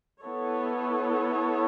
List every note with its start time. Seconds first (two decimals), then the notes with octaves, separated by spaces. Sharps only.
0.21 B3 E4 A4 C#5